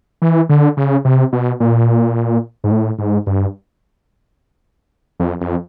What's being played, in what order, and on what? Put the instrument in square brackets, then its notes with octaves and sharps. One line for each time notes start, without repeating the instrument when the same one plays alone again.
[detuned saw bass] E3
D3
C#3
C3
B2
A#2
G#2
A2
G#2
G2
F2
F2